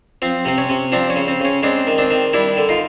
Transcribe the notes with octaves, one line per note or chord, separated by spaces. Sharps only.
F3 C4
C3 C4
C#4
C3
F3 C4 D4
C#4
C#3
C4
C#3 C#4
G#3 C4 D4
D#3
C4 D4
D#3
G3 D4 E4
D3
D#4 F4